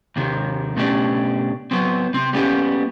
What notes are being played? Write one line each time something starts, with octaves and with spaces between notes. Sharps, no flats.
D#2 C3 D#3
B2 A3 C#4 D4 G4
F#3 B3 C4
C3 C4
G3 A#3 B3 C#4 F4 G4